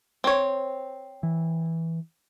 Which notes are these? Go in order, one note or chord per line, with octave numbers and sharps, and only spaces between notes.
C4 C#5
E3